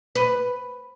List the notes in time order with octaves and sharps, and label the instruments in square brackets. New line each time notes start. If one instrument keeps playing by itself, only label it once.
[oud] B4